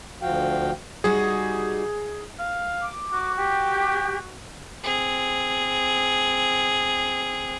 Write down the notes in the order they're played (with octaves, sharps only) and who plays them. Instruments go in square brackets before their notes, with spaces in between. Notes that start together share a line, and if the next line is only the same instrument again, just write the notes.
[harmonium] D2 F3 F#4 F5 G5
[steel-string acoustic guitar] G3 D#4 F#4 [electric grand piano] G#4
[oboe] F5
[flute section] D6
[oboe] F#4
[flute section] G4
[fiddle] C4 G#4